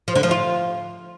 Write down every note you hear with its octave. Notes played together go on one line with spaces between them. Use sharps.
F3
D3
F3
F4